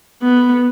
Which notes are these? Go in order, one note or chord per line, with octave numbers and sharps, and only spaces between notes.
B3